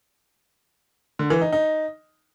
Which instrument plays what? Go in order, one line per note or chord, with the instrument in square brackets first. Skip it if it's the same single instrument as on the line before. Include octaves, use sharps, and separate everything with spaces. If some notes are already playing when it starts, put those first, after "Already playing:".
[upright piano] D3
E3
D#4
D#4